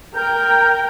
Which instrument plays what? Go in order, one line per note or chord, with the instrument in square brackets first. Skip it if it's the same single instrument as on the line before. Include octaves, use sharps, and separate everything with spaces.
[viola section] A#4 G5 [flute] G6